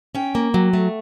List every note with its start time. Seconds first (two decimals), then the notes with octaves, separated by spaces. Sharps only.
0.15 C#4 G5
0.35 A#3
0.54 F#3
0.73 A3